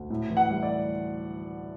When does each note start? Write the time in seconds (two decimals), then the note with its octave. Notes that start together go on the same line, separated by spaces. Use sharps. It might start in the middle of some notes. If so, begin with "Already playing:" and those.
Already playing: D2
0.10 A2
0.30 E3
0.37 F#5
0.49 G3
0.63 D5